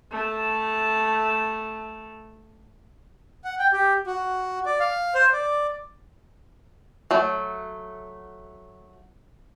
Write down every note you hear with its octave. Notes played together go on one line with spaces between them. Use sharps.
A3 A5
F#5
G5
G4
F#4
D5
F5
C5
D5
F#3 A3